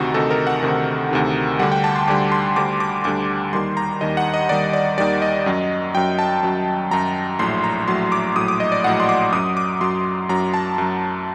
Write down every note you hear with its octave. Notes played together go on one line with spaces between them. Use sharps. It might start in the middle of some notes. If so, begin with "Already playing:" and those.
Already playing: D2 C3 D#3 D#4 F#4
D2 C3 D#3 A4
A#4
F#5
D2 C3 D#3
D2 C3 D#3
D2 D3 G3 F#5
G5
A5
C6
D2 D3 G3 D6
C6
D2 D3 G3 D6
D6
D2 D3 G3 D6
D#2 D#3 G3 C6
A#5
D#2 D#3 G3 D#5
F#5
D#5
D#2 D#3 G3 D5
D5
D#2 D#3 G3 D5
D#5
F#2 F#3
F#2 F#3 G5
A5
F#2 F#3
F#2 F#3 A#5
A#1 A2 F#3 C6
A#5
A#1 A2 F#3 C6
D6
A#1 A2 F#3 D#6
D6
D#5
D5
A#1 A2 F#3 F#5
C6
D6
F#2 F#3 D#6
D6
F#2 F#3 C6
F#2 F#3 A#5
A5
F#2 F#3